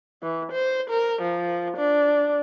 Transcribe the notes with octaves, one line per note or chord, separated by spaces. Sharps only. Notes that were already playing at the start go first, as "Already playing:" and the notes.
E3
C5
A#4
F3
D4